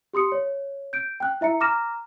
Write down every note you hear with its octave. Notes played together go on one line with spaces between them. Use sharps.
G4 C6 D#6 C#7
C#5
G6 D7
G5 F#6
E4 E5 A#5 C#7
A#5 D6 F6 A#6 E7